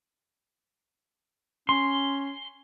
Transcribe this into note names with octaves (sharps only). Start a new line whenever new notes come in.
C#4 C6